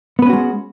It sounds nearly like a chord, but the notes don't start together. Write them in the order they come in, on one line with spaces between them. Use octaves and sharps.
B3 B4 C#4 F#4 G#3